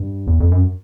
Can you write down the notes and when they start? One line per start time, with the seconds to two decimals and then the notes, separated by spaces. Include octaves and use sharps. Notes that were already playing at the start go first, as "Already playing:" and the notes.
Already playing: G2
0.27 E2
0.40 F2
0.52 F#2